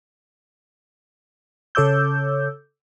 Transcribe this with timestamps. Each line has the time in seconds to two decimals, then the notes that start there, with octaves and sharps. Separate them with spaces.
1.75 C#3 A4 C#5 D6 E6 G6